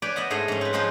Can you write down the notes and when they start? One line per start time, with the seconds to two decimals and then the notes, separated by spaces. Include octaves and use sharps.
0.02 B4 C#5 D5 G5 G#5
0.16 B3 D#5 E5 F#5
0.30 G#2 A3 G#4 D#5 C6
0.48 G#2 C#4
0.61 C4 B4
0.73 F3 G#3 C#4 D#4 C5